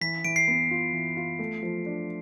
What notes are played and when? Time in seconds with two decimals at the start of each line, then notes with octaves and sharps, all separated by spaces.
0.01 E3 B6
0.24 E3 D7
0.36 C7
0.48 B3
0.71 F4
0.93 E3
1.17 F4
1.39 A3
1.63 F3
1.86 D4